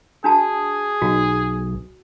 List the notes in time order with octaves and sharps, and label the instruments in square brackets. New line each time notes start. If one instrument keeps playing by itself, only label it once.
[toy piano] D4 F#4 A5 [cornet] G#4
[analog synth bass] B1 [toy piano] F#4